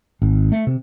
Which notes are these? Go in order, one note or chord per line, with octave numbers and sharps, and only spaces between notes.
G#1
A3
C3